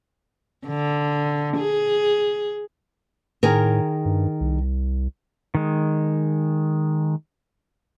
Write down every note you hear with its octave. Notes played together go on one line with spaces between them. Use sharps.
D3
G#4
A2 D#3 G#4 A#4
G2
C2
D#3 G#3